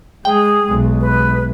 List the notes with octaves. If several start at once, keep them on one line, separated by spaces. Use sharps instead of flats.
G#3 G#4 G5
B1 G#3
B4